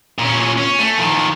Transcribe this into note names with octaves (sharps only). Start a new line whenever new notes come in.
A#2 C#4
C#4
A3
D#3 F3